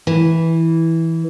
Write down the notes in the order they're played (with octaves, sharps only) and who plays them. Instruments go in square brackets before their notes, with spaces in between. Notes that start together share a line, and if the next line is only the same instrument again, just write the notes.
[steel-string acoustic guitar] E3